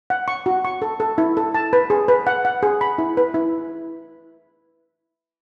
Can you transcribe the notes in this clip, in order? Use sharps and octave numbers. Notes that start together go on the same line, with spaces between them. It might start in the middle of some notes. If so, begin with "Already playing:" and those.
F#5
C#6
F#4
C#6
A4
A4
E4
A4
A5
B4
G#4
B4
F#5
F#5
G#4
B5
E4
B4
E4